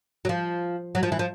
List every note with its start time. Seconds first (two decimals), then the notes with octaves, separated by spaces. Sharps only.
0.25 F#3
0.29 F3
0.95 F#3
1.03 F3
1.12 E3
1.19 F3